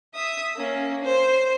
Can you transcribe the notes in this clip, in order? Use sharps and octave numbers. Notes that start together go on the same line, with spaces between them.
E5 D#6
A#3 C#4
C5